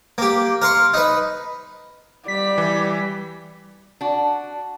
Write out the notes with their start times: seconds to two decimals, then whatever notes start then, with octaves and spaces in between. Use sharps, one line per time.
0.18 A#3 G4
0.62 A#4 F5 C6 C#6
0.94 D#4 B4
2.28 G3 D5 B6
2.58 E3
4.01 D4 F#4